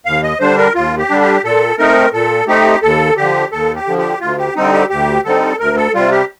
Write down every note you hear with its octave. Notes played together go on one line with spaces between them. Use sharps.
D#2 F5
D#5
D3 G3 D4 C5
A#4
D#2 F4
G4
D3 G3 D4
G4
A#2 A4
A3 C4 D#4 A#4
A#2 A4
A3 C4 D#4 G4
D#2 A4
D3 F3 G4
D#2 A4
G4
D3 F3
G4
D2 F4
G4
D3 G3 C4 D#4
G4
D2 G4
D3 G3 C4 D#4 A4
D2 A#4
A4
C3 G3 F4
G4